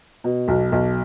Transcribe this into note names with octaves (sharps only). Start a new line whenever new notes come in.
B2
B1
B1